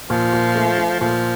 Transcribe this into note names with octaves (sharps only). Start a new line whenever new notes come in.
A#2 F3
A#2
A3
A3
A#2 F3